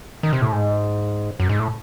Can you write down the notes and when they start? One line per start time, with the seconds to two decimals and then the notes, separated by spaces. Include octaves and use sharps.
0.23 D#3
0.33 C3
0.42 A2
0.52 G#2
1.40 F#2
1.49 G#2
1.59 A2